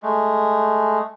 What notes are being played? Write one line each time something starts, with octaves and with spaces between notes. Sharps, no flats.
G#3 A3